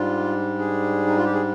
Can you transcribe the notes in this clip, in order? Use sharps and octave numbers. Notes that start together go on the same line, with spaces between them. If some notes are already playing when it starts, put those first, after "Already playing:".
Already playing: G#2 G3 D4 F4
G#4
D#4
F4
G4
G#4